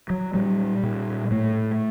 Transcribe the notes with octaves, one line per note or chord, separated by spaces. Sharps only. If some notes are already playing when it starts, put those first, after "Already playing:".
F#3
A#2 G3
A#2
A2 A3